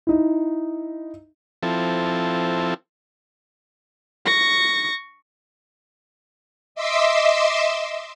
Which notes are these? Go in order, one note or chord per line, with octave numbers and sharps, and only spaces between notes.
D#4 E4
F3 C4 E4 A4
C#6 A#6
D#5 E5 C6 D6 E6